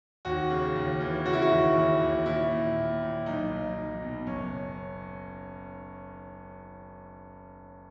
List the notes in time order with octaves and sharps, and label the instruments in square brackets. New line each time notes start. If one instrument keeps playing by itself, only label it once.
[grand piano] D#2 F#4
C#3
D#2
E3
C#3 F#4
E4
F#4
D#2
D#2
D#2
A#2 E4
A#2
A#2
A#2
B1 D#4
B1
B1
B2
F#1 C#4